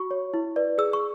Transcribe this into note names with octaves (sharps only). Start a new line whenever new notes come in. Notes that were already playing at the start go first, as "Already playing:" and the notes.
Already playing: F#4 C#6
C#5
E4
B4 D5
G#4 E6
C#6